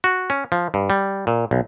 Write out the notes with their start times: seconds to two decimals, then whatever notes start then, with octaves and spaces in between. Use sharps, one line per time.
0.04 F#4
0.30 C#4
0.52 F3
0.74 G2
0.90 G3
1.27 A#2
1.51 B1